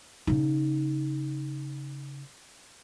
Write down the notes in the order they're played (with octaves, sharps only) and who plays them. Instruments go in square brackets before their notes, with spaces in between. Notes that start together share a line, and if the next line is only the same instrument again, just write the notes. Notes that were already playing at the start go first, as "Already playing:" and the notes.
[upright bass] C#3 D#4